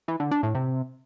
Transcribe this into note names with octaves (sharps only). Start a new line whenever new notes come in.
E3
D3
D4
A2
C3